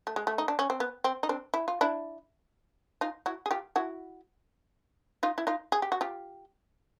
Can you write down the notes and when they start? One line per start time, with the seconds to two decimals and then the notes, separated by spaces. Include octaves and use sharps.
0.07 A3
0.16 G#3
0.27 A3
0.38 D#4
0.48 D4
0.59 C#4
0.70 C4
0.80 B3
1.04 C4
1.23 D#4
1.29 C4 D4
1.54 E4
1.68 F4
1.81 D4 E4
3.01 D#4 F4
3.26 E4 F#4
3.46 G#4
3.51 F4 G4
3.76 E4 F#4
5.23 D#4 F4
5.38 E4
5.47 D#4 F4
5.72 G#4
5.82 G4
5.92 F#4
6.01 F4 G4